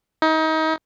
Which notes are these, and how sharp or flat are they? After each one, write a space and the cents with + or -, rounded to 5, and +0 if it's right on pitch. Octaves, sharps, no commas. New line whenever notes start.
D#4 +30